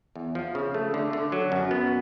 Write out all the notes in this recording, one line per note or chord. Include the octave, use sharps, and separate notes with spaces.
E2
F3
C#3
A3
D3
D3
F#3
F#2
B3